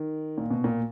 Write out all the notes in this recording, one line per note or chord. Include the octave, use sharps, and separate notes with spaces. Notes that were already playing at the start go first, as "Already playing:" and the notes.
Already playing: D#3
A#2
B2
A#2